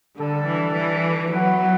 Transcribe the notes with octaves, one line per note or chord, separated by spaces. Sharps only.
D3 G3 D4 A4
E3
E3
F#3 B3 E4 B4 F#5